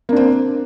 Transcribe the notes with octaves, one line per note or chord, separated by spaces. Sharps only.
A#3 C4 D4